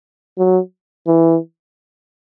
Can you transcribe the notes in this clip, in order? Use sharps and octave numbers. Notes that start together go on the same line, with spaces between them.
F#3
E3